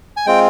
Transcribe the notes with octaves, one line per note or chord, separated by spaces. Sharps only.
G#5
G#3 C4 F4 G5